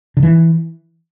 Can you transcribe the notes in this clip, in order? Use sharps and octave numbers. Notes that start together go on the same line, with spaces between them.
D3
E3